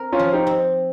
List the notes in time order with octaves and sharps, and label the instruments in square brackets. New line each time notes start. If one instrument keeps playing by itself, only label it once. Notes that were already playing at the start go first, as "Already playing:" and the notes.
Already playing: [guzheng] C4 A#4
[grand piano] C#4 F4
[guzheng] F3
[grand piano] D#4 G4
[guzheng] C4